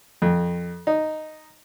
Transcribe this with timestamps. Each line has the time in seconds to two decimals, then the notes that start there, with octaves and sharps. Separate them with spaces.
0.22 F2
0.87 D#4